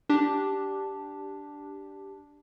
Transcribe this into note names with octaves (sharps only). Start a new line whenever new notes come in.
D4 G4